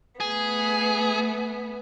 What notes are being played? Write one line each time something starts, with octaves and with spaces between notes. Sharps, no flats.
A3 B3 G#4